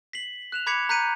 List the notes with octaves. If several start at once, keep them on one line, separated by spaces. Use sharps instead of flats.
B6 C7 F#7
F#6 E7 F7
B5 D6 G#6 B6 C#7 F7
A#5 F#6 G6 B6 C#7 D#7